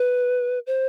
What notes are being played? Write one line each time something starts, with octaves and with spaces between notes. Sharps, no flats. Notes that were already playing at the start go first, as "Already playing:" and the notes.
Already playing: B4
C5